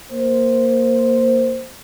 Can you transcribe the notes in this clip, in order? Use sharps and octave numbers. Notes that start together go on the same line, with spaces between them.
A#3 C5